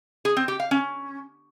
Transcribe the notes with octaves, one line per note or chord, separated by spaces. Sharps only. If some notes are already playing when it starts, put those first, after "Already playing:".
G#4
C4
G4
F5
C#4